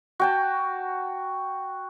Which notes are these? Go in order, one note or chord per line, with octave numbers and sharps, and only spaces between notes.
F#4 G5 A5